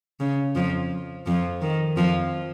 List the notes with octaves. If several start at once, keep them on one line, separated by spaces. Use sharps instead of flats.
C#3
F2 F3
F2 F3
D#3
F2 F3